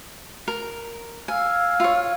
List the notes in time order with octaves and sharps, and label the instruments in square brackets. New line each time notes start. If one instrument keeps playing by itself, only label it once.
[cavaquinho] A#4
[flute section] F5 E6 F6 [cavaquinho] G#5
[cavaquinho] F4 C#5